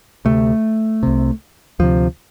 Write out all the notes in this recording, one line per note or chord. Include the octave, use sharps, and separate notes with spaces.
D2 C3 A3
C2 C3
D2 C3 F3